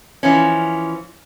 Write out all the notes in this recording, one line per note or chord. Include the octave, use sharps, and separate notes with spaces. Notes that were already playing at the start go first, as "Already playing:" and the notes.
E3 F3 C#4